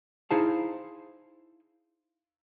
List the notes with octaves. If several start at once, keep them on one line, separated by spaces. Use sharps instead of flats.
D#4 E4 G#4 C5 F5 A5